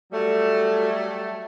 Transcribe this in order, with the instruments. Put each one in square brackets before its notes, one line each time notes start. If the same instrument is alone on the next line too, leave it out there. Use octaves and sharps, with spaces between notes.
[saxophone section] F#3 G3 A3